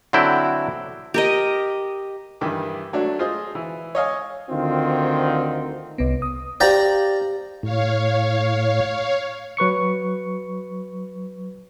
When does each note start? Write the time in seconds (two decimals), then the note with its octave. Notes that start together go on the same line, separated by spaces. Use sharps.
0.13 D3 F#3 C4 E4 G5
1.14 G4 A#4 D#5
2.41 G2 D#3 E3 D6
2.93 F#3 A3 D4
3.19 F4 G#4 C5 D#5
3.55 E3
3.95 C#5 D#5 F5 G#5
4.50 D2 D3 D#3 C4 F4
5.98 C2 B3
6.22 D#6
6.60 G4 C5 D5 F5 G5 A#5
7.63 A2 C#5 F5
9.57 F#3 B4 C#6 C#7